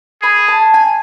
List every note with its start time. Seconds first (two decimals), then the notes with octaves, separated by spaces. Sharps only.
0.22 G#4 B5
0.48 A5
0.74 G#5